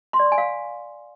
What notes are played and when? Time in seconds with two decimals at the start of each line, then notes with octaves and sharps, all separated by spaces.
0.13 C6
0.19 D5
0.26 C#6
0.32 G#5
0.38 F5